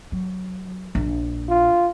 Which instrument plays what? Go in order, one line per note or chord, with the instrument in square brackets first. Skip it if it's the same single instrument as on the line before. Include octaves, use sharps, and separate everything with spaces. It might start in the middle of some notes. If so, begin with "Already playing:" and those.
[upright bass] F#3
A#1
[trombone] F4